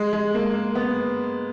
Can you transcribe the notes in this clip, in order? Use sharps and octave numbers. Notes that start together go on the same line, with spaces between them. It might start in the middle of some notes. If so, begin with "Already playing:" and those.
Already playing: G#3
G#3
A#3
A#3
B3